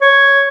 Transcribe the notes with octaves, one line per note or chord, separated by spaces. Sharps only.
C#5